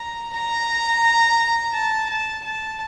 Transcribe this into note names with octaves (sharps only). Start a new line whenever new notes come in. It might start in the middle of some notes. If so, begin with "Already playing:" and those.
Already playing: A#5
A#5
A5
A5
A5